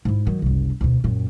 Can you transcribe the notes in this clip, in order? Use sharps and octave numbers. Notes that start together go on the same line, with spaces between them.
G#2 E4
D#3 F#3
F#1 C2
D2 B2
F#2 A#2